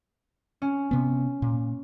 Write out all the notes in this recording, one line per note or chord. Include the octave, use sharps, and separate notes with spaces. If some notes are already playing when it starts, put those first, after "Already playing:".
C#4
C3 B3
A#2